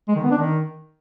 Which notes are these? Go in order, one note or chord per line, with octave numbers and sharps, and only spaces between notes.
G#3
D#3
B3
D4
D#3